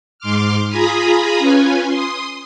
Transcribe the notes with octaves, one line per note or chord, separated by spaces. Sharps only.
G#2 C6 D6 F6
F4 G#4 G#5 A#5 B5 D#6
C#4 F4 B4 G#5
C6 D#6